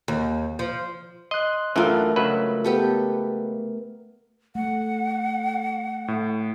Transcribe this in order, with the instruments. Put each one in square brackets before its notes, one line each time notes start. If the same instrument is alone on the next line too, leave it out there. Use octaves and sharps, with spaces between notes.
[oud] D#2
F3
[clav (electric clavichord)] D#5 [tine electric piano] C6 F#6
[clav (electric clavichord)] F#2 E3 [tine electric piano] A3 A#4 [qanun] D4 F4
[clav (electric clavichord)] C#2 F#3 B4
[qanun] B3 G4 A4
[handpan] A3 [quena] F#5
[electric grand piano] A2